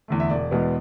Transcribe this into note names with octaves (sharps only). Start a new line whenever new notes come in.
E2 D3 A3
E5
E1 D5
E2 B2 G#3 B3